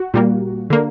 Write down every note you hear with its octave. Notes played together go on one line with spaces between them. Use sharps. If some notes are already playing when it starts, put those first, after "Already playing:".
Already playing: F#4
A#2 G3 A#3
D3 A#3